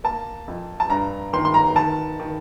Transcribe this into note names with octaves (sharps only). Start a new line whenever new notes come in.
A#3 A5
F2
A5
G2 A#5
D#3 C6
C6
A#5
D#3 A5
D#3